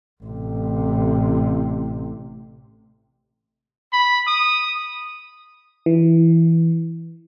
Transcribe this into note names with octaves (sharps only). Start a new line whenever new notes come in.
A1 C3
B5
D#6
E3